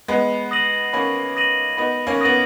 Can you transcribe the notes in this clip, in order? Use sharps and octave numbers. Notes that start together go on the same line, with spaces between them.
G#3 B3 B5
D#6 A#6 D#7 F#7
A#3 C#4 B5
D#6 A#6 D#7 F#7
B3 D#4 B5
A#3 C#4
B3 D#6 A#6 D#7 F#7